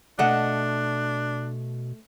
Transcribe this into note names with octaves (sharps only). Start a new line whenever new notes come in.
B2 A3 D4 D#5 F#5